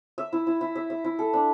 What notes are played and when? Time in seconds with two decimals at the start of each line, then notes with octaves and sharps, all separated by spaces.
0.18 E5
0.33 E4
0.47 E4
0.61 E4
0.76 E5
0.90 E5
1.04 E4
1.19 A4
1.33 D4